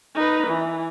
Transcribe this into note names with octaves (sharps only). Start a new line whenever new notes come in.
D#4 B4
E3